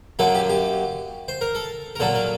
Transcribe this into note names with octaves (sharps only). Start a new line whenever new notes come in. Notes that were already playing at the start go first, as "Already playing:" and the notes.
F#2 F#3 A#3 A4
G4
G4
C5
A#4
A4
A#4
A#2 F#3 A#3 A4
A#4